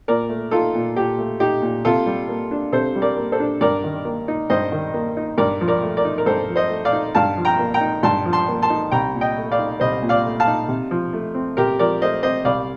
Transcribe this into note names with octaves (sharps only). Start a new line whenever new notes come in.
A#2 A#4 D5
A3
D#4 F4 A4
A#2
A#2 G4
A3
D#4 G4
A#2
C3 F4 A4
G3
A#3
D4
C3 A4 C5
G3
A#4 D5
A#3
A4 C5
D4
G2 A#4 D5
D#3
A#3
D#4
G2 C5 D#5
D#3
A#3
D#4
G2 A#4 D5
F3
A#4 D5
A3
A#4 D5
D#4
A#4
G2 A4 C5
F3
C5 D#5
A3
D5 F5
D#4
G2 F5 A5
F3
G5 A#5
A#3
G5 A#5
D#4
G2 A5 C6
F3
A5 C6
A#3
A5 C6
D#4
C2 G5 A#5
A#2
D#5 G5
A3
D5 F5
D#4
C2 C5 D#5
A#2
D5 F5
A3
F5 A5
D#4
C3
F3
A3
C4
C3 G4 A#4
F3 A#4 D5
A3 C5 D#5
C4 C5 D#5
C2 D5 F5